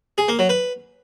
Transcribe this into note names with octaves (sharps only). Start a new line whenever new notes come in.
G#4
A#3
F#3
B4